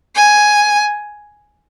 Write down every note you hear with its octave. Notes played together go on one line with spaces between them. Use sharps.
G#5